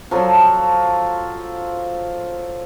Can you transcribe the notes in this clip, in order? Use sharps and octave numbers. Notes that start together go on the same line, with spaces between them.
F3 F#3 A4